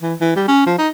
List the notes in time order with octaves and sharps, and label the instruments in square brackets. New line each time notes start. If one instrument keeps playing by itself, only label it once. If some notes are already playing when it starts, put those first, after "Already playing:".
[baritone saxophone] E3
E3
G3
C#4
F3
D#4